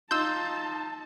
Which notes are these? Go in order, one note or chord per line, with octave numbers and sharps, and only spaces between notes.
D#4 F4 A5 C6 E6 G6